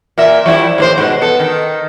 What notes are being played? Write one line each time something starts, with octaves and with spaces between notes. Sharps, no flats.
A#2 A#4 E5
F3 G3 E4
D#2 A2 C5
G#2 B2
B3 A4
D#3